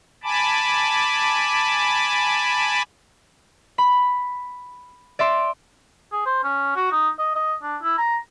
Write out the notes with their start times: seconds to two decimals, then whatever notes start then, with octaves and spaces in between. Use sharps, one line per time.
0.24 G#5 A5 B5 D6
3.78 B5
5.19 D5 E5 C6
6.12 G#4
6.26 C5
6.43 C#4
6.76 F#4
6.92 D#4
7.19 D#5
7.35 D#5
7.63 D4
7.82 E4
7.98 A#5